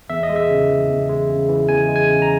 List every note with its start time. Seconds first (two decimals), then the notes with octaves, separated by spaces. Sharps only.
0.10 E2 E5
0.23 D#5
0.29 G#3
0.36 E5
0.49 C#3
0.69 E3
0.89 E2
1.09 G#3
1.29 C#3
1.49 E3
1.69 E2 G#5
1.89 G#3
1.96 G#5
2.09 C#3
2.22 A#5